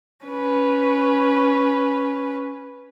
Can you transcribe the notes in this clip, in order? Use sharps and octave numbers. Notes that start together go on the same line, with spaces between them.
C#4 B4